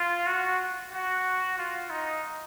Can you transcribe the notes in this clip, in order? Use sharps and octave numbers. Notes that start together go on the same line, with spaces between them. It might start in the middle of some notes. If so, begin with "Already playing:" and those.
Already playing: F4
F#4
F#4
F4
D#4